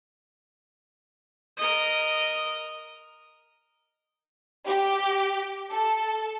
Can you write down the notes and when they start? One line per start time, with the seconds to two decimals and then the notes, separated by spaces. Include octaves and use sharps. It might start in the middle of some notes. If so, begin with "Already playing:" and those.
1.57 A#4 D#5
4.67 G4
5.70 A4